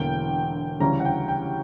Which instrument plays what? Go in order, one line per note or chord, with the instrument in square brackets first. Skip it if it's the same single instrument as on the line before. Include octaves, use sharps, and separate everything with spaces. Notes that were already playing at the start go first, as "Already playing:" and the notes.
Already playing: [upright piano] E1 E2 D3 A#3 G5
D2 C#3 E3 G3 C#4 A#5
F#5
G5
G5